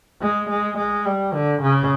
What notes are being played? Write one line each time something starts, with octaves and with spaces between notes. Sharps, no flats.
G#3
G#3
G#3
G3
D3
C#3